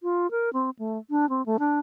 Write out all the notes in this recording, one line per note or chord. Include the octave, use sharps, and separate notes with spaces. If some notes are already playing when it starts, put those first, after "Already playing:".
F4
A#4
C4
A3
D4
C4
A3
D4